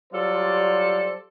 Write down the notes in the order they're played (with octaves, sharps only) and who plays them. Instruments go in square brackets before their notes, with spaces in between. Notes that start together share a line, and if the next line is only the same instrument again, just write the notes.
[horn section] F#3 G3 F4 A4 C5 D5